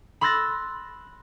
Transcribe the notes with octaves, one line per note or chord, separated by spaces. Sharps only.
B5 C6 E6 F#6 A6 A#6